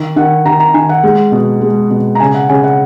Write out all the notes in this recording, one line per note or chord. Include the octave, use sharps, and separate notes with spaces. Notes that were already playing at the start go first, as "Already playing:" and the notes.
Already playing: D#3
D#3 F#5
D#3 A#5
A#5
D#3 G#5
F#5
G#3
B2
G#3
B2
A#5
C#3 G#5
F#5
C#3 G#5
F#5